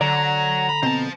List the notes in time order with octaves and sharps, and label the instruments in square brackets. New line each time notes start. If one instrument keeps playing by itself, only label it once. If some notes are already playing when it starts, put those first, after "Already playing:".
[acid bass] D3 [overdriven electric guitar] F#3 [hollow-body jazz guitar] D5 [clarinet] A#5
[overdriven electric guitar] B5
[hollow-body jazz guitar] B2 C4 [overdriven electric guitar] C5 A5